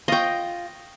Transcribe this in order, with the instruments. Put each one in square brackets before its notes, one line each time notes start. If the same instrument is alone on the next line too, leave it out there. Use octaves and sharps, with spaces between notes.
[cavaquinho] F4 C#6 [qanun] D#5 G5